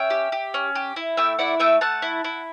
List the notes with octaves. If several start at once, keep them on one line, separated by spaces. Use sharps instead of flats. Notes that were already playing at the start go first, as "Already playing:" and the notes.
Already playing: C#4 E5 G5
G4
G4
C#4
G4
E4
A3 E5 G5
E4 D5 F#5
A3 E5 G5
A3 F#5 A5
E4
E4